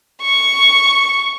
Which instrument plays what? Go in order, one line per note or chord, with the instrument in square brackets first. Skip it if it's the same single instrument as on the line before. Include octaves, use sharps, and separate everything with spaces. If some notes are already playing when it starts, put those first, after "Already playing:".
[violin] C#6